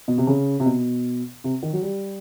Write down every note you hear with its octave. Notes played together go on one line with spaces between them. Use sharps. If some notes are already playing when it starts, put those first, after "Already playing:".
B2
C3
C#3
C3
B2
C3
D#3
F#3
G3